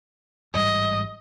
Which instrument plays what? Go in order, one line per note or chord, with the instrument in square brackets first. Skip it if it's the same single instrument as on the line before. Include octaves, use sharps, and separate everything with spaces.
[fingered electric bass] A1 G#2 G3 [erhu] D#5